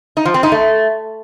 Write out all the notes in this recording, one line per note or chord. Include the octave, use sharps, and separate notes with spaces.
D#4
F3
C4
D#4
A3